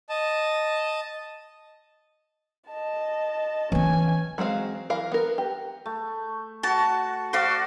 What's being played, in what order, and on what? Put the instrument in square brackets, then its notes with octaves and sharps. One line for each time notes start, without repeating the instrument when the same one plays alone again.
[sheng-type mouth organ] D#5 A5
[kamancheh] D#5 A5
[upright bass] E3 B3 [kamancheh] C#4 G#5
[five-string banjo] F#3 G#3 C4 F5
E3 A#4 F5
B3 A#4
G4
[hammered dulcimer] A3
[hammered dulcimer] F#4 C#6 [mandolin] A5
[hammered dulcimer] F#4 D5 [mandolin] C5 F5